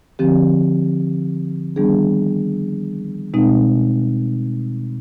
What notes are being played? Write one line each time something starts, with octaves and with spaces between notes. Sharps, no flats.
D3 F3 C4 G4
D#3 G3 B3 D4 G#4
B2 G#3 C4 D#4